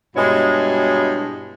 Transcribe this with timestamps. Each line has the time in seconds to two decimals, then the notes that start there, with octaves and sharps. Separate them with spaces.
0.16 G2 B2 G#3 E4 F#4 C#5